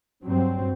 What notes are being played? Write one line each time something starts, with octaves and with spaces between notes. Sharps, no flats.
G2 F#3 C4